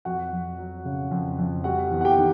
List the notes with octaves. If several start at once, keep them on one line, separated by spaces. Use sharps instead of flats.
F2 F#4 F#5
F2
F#3
C#3
F2
F2
G3 F#4 F#5
E2
F#5
G4 G5
D#3